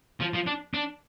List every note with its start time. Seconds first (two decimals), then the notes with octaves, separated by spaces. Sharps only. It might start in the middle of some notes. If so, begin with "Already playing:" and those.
0.20 F3
0.34 F3
0.46 D4
0.74 D4